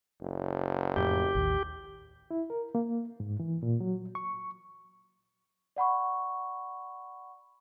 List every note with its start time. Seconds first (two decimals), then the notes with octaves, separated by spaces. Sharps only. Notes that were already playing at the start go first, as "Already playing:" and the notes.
0.21 F#1
0.97 F2 A2 G4
1.35 A1 D#2
2.31 E4
2.50 A#4
2.75 A#3
3.20 G#2
3.40 E3
3.63 A#2
3.80 F#3
4.15 C#6
5.76 D5 F#5 B5 C#6